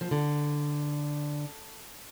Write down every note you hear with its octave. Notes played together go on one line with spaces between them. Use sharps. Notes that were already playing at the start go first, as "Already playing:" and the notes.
F3
D3